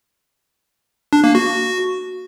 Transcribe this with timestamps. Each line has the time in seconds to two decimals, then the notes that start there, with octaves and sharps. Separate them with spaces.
1.13 D4
1.24 A#3
1.35 F#4